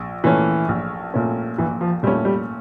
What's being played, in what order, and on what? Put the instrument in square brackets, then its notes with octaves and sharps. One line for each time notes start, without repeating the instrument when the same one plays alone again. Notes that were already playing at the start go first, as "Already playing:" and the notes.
Already playing: [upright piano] A#1
[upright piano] A#2 A3 C#4 [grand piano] E3
[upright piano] A#1
A#2 A3 C#4
[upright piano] A#1 [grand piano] E3
[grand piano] F3
[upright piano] A#2 A3 C#4 [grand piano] G3
[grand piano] G3